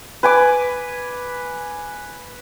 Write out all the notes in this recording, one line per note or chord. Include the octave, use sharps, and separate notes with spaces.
B4 G#5 D6